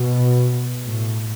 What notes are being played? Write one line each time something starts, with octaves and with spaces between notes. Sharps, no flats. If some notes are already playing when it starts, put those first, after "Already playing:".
Already playing: B2
A2